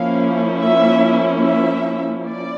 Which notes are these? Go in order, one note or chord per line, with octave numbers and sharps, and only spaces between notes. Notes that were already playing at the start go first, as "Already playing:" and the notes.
Already playing: F3 A#3 C#4 E4 F5
E5
E5
D5